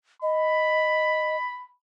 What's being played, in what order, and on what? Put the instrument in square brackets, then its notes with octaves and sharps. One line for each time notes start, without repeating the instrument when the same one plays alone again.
[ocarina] D#5 [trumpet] B5